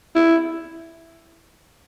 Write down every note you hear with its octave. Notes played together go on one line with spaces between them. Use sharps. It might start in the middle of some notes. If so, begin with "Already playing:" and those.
E4